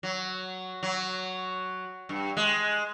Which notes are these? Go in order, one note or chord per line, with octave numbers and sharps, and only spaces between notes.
F#3
F#3
G2
G#3